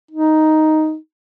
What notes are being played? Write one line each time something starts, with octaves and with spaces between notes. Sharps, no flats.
D#4